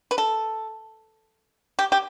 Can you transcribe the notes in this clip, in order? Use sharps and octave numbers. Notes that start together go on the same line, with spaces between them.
B4
A4
G4
G4